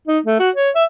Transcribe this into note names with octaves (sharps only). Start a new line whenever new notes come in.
D#4
A3
F#4
C#5
E5